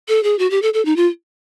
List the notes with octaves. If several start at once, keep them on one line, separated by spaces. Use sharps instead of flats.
A4
G#4
F#4
G4
A4
A4
D#4
F4